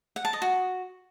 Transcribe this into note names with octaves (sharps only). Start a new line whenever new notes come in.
F#5
A5
D#5
F#4